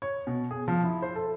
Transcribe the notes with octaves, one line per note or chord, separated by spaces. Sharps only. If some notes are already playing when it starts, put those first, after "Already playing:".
C#5
B2
G#4
F3
E4
C5
A4